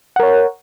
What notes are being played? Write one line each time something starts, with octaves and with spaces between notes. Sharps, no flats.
A#4 C#5 F#5